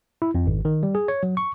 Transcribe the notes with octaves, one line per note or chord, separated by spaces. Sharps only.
E4
F2
G#1
D#3
G3
G#4
C#5
F#3
C#6